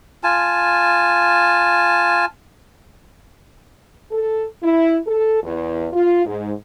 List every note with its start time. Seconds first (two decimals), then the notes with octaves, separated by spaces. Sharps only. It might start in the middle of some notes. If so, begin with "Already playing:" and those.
0.24 F4 G#5 A5
4.11 A4
4.62 E4
5.06 A4
5.42 E2
5.93 F4
6.24 G#2